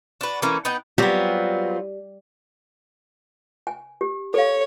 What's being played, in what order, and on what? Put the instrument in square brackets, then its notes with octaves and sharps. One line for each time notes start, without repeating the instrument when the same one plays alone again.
[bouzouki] D4 F#4 B4
E3 A3 A#3 C#4
B3 D#4 F#5 G5
[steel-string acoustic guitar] F#3 F4 [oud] G3 [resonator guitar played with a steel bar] B3 C4 [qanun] G4
[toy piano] G#5
G4
[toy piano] A4 F5 [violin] C#5